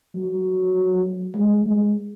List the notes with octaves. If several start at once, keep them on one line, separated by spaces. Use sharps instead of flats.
F#3
G#3
G#3